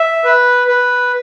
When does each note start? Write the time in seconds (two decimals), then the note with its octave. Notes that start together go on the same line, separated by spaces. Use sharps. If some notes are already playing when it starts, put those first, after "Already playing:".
Already playing: E5
0.24 B4
0.68 B4